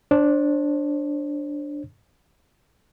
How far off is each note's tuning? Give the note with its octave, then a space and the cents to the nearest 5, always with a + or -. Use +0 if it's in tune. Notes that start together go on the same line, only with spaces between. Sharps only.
D4 +0 C5 +35